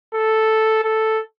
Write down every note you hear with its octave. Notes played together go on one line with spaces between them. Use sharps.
A4
A4